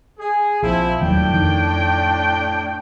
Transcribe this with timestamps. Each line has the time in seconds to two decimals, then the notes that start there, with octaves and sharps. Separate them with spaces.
0.19 G#4
0.62 A#1 F3 C4 E4
1.01 E1 D#2 A2 F#3 D4 G5
1.29 F2 D#3